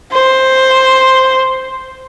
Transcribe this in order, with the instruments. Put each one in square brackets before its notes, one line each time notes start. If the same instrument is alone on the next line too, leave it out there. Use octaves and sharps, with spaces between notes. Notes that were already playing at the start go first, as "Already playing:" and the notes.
[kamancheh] C5